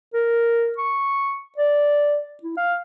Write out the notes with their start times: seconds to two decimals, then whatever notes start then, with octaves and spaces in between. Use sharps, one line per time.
0.14 A#4
0.78 C#6
1.58 D5
2.43 E4
2.57 F5